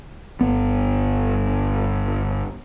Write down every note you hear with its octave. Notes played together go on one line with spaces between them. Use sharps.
G1 B3